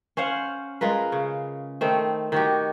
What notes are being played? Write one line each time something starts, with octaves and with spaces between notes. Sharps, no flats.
C#4 C5 F5 F#5
G#3 F4 A#4 B4
C#3
D#3 A3 C4
D#3 F#4 G4